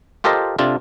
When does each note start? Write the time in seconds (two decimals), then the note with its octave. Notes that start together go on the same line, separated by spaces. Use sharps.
0.24 F4 G4 A4 A#4 C5 D#5
0.59 C3 D4 F4 A4